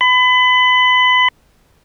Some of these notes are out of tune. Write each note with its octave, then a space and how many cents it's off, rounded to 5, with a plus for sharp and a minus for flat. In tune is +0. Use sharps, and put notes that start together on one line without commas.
B5 +30